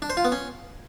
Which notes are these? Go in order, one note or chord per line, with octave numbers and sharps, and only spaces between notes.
D4
C5
F4
B3
C#4